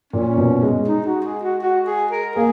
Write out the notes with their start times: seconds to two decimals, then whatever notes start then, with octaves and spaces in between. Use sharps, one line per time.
0.13 A#2 C#4
0.38 B2
0.63 G#3
0.88 D#4
1.06 F#4
1.25 G#4
1.43 F#4
1.62 F#4
1.87 G#4
2.11 A#4
2.36 A#3 G#4